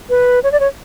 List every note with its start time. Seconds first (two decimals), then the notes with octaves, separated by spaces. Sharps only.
0.10 B4
0.43 C#5
0.52 D5
0.60 C#5